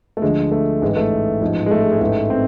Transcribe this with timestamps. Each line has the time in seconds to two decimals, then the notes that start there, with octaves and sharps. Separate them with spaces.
0.17 A3
0.22 D2 D3 F3 G#3
0.51 A3
0.82 A1 G#2 E3 G#3
0.97 A3
1.41 A1 G#2 F3
1.66 G#3
1.71 A3
1.81 G#3
1.92 G#3
2.01 A1 G#2 E3 A3
2.30 C4